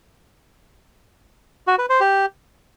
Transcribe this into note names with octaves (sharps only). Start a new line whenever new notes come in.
F#4
B4
C5
G4